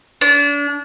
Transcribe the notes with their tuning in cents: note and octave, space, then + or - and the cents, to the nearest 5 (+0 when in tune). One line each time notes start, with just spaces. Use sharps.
D4 -35